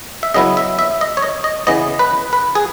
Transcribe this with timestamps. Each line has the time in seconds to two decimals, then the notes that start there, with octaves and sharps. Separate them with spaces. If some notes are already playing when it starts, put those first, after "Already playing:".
0.23 E5
0.34 C#3 F#3 B3 E4 D#5
0.57 E5
0.79 E5
1.01 D#5
1.17 C#5
1.22 D#5
1.44 D#5
1.67 C#3 E3 B3 D#5
1.99 B4
2.33 B4
2.55 G#4